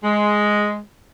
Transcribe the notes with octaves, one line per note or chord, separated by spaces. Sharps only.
G#3